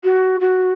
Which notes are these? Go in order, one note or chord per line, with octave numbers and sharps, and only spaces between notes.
F#4
F#4